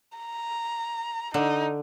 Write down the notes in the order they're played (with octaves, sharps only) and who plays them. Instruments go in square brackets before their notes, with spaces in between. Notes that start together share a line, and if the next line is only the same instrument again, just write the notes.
[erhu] A#5
[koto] D3 [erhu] D#4